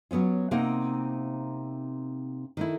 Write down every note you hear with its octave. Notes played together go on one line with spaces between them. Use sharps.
F#3 B3 C#4 F4
C3 A#3 C4 D#4 F#5
D#3 A3 E4